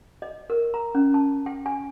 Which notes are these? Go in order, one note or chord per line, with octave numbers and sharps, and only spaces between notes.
D#5
A#4
A#5
C#4
A5
G5
G#5